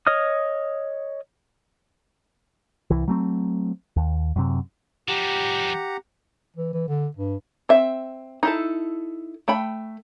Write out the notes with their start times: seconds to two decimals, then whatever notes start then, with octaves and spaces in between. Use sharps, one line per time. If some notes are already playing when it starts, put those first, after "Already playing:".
0.07 C#5 D#5 D#6 F6
2.90 C2 E3
3.08 F#3 A3 C4
3.96 D#2
4.36 F#2 C3
5.08 F3 G3 G4 F#5 A#5
6.57 E3
6.73 E3
6.88 D3
7.17 G2
7.69 C4 E5
8.43 D#4 E4 A4
9.48 A3 G5 B5